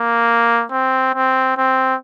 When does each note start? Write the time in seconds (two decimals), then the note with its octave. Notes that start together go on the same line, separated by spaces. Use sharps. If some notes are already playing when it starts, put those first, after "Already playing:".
Already playing: A#3
0.72 C4
1.15 C4
1.57 C4